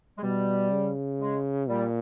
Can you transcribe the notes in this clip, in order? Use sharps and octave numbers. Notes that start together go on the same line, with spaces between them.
G#3
B2 G3
C#3
G#3
A#2 G3